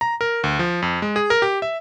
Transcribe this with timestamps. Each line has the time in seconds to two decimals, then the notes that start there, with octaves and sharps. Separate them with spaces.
0.01 A#5
0.21 A#4
0.44 D2
0.59 F3
0.82 F2
1.02 G#3
1.16 G#4
1.30 A#4
1.42 G4
1.62 E5